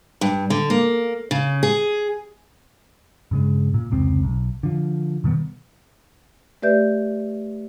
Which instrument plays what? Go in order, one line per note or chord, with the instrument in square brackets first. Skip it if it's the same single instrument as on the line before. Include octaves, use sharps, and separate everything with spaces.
[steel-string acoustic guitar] G2
D3
A#3
C#3
G#4
[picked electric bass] G2 C#3 G#3
A#2
F1 C#2 C4
B1
D3 F3
B2 D#3 G3 B3
[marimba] A3 G4 B4 D5 E5 G6